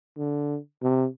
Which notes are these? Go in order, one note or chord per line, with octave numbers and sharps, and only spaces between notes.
D3
C3